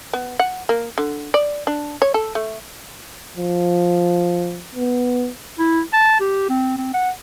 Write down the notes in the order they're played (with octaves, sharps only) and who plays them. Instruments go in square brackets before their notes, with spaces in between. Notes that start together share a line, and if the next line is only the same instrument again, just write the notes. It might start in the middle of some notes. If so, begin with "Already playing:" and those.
[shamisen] B3
F#5
A#3
D3
D5
D4
C#5
A4
A3
[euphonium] F3
B3
[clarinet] E4
A5
G4
C4
C4
F#5